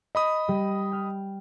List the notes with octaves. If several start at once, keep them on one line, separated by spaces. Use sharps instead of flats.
D#5 B5 D#6
G3
G5 F6